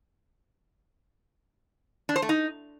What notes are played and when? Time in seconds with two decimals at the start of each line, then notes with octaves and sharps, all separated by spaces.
2.09 D4
2.16 C5
2.22 A3
2.29 D#4